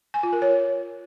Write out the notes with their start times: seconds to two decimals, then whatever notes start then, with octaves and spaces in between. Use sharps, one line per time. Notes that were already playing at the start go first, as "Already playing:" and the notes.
0.14 G#5
0.23 F4
0.33 A#4
0.42 C#5